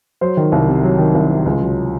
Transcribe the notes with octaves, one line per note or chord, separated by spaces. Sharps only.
F#3 C5
D#3
C2
C3
F#3
D#3
C2
C3
C#2
F#3